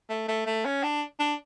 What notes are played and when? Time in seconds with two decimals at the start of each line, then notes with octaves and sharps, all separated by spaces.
0.09 A3
0.28 A3
0.46 A3
0.65 C#4
0.83 D4
1.19 D4